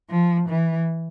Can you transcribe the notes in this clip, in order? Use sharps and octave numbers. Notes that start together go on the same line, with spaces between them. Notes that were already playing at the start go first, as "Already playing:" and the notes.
F3
E3